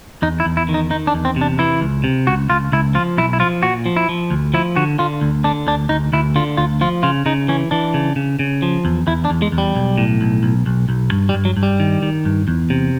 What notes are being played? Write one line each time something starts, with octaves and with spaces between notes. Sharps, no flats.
E2 D#4
E4
E2
E4
D#3
D#4
D#3 D#4
D4
E2
C4
C3
D4
E3 E4
C#2
C3
C#2 F#4
C#2 F4
C#2 E4
F3 F4
B1 E4
E4
F3 F4
A#2 F#4
F3
E4
F3
D2
F3 E4
D3 F#4
D3 F4
D2
D3 D4
D2 D4
D2 D#4
D2 E4
D3 F4
D2 F4
F3 F4
C#3 F4
C#3 D#4
E3 C#4
E3 D4
C#3
C#3
C#3
F3
E2
E2 E4
D4
E2
G#3
E2
G3
B1
A2
B1
B1
B1
B1
G2
G3
G2
F#3
G2
G3
D#3
D#3
G2
E2
C3